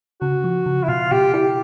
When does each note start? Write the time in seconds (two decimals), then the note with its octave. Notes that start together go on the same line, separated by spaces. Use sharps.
0.21 C#3 F#4
0.44 F3
0.66 C#3
0.83 E4
0.88 B2 F4
1.11 B2 G4
1.34 E4 G4